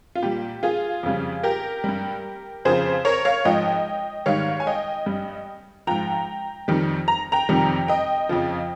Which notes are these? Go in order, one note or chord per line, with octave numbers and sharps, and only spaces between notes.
F4
A#2 G3 G4
F4 G#4
F2 C#3 G3
G4 A#4
G2 G3
F2 C#3 F3 G#4 C5
A#4 C#5
C#5 F5
G#2 F3 D#5 G5
G#2 D#3 G3 C#5 F5
G#5
D#5 G5
G2 G3
G#2 F3 G5 A#5
F2 D#3 G3
A#5
G5 A#5
F2 C3 D#3 G3
D#5 G5
F2 C#3 F3